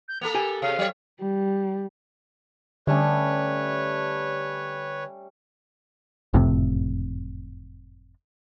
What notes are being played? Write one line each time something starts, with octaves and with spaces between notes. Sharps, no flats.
G6
A#3 B3 A4 F7
G4 G#5
C3 F5
F#3 C#5
G3
D3 G3 A3 C#4 B4 C#5
F#1 F2 A2 C3